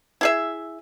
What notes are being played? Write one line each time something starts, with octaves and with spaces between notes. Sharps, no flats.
E4 G#4 E5